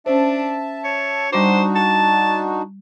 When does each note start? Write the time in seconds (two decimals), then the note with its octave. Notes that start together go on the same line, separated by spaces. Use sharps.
0.06 C#4 D4 C5 E5 A5
0.84 C#5
1.33 G3 D4 D#4 F#4 C5 D6
1.76 A5